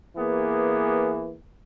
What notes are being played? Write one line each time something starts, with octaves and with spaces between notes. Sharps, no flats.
E3 A#3 B3 G#4